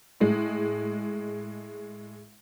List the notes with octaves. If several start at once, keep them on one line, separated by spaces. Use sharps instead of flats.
A2 G#3